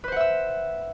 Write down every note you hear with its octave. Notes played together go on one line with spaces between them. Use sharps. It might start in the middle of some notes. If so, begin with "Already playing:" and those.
B4 C5 E5 F#5 E6